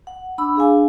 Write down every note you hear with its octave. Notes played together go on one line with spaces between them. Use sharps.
F#5
D4 B5 E6
D4 G#4 F5 G#5